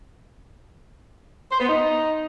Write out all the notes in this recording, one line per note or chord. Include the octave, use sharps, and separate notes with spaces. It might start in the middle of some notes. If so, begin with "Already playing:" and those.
C5
B3
D#4